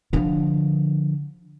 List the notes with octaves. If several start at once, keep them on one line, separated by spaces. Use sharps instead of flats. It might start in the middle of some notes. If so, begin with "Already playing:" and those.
D3 F3